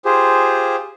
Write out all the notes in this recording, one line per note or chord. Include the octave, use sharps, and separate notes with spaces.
F4 G4 G#4 C5